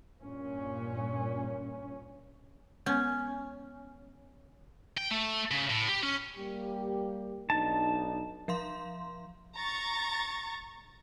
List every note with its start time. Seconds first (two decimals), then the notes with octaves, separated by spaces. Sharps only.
0.22 G2 A#2 C#4
2.86 G#3 B3 C#4
4.97 G5
5.11 A3
5.51 C#3
5.70 A2
5.89 G4
6.03 C#4
6.36 G3 A#3 G4
7.50 B1 D4 D#4 A5
8.48 F3 F5 C6
9.57 A#5 C#6 A6 A#6